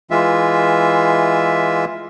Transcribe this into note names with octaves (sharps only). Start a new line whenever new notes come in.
E3 G#3 F4 E5